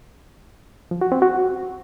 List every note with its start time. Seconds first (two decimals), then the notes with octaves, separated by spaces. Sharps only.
0.91 F3
1.01 F#4
1.12 C4
1.22 F#4